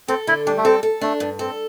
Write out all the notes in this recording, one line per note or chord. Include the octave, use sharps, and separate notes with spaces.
C4 A4
D3 E4
G3 D4
A3
C4 A4
A4
A3 D4
G2
C4 A4